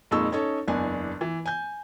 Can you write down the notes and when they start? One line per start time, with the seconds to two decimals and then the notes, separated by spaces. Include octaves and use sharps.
0.11 F2 A#2 G#3 D#4 C#6 E6
0.32 C#4 D#4 A4 C#5
0.68 F#1 E2 D4 G#5
1.21 E3
1.46 G#5 G6